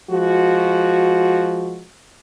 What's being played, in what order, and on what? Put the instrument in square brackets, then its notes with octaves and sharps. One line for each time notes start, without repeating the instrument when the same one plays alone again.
[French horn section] F3 G#3 F#4